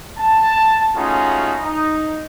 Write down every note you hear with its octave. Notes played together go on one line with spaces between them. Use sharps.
A5
A3 C#4 D#4 F4 F#4 G#4
D#4